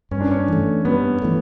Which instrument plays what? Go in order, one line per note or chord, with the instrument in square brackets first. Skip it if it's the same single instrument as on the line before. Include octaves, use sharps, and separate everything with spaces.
[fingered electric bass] G2 [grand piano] C#4
[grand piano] D4
C#4
[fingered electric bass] E3 A3
[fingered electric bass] G2 [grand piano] B3
[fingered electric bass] E3 A3